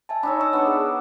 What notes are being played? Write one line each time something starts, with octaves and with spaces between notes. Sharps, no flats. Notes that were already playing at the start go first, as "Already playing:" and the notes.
E5 G#5 A5
D4 D#4 C#5 B5 E6
C#6 E6
B3 A4 D5
G#4 F#5